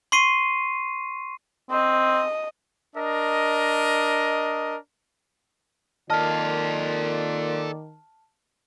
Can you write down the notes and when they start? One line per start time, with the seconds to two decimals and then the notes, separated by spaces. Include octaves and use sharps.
0.12 C6 C#6 C7 D#7
1.71 C4 D#5
2.95 D4 A#4 D#5
6.10 D#3 A#3 F4 A4 D5 D#5 A5 F6